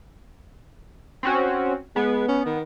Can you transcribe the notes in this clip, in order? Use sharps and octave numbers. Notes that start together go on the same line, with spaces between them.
C4 C#4 F#4
G#3 B3
C#4
D#3